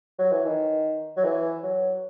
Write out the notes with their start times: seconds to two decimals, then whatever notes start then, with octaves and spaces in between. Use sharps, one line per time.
0.19 F#3
0.32 E3
0.45 D#3
1.16 F#3
1.24 E3
1.63 F#3